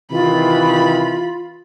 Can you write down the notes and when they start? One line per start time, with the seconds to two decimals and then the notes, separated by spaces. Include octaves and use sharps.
0.12 C3 D#3 E3 F4 B5